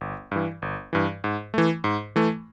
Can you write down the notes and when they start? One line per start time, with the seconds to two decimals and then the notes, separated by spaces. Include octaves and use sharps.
0.01 G1
0.31 G2 E3
0.62 G1
0.93 G2 E3
1.24 G#2
1.54 E3 A3
1.84 G#2
2.16 E3 A3